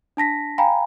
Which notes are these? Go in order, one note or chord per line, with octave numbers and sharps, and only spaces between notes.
D4 A5 A#6 B6
F5 G5 G#5 A#5 B5